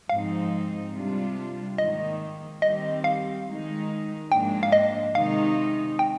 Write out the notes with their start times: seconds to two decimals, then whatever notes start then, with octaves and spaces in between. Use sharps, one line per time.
0.09 G#2 F3 C4 D#4 F5
0.94 C3 G3 D4 F4
1.78 G#2 D#3 A#3 D#5
2.62 D#3 G3 C4 G4 D#5
3.04 F5
3.47 D#3 G#3 D#4
4.31 G#2 F3 A#3 D4 G5
4.63 F5
4.72 D#5
5.15 C3 D#3 G#3 D#4 F5
5.99 G5